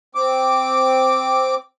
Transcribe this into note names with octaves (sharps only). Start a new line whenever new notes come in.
C4 D6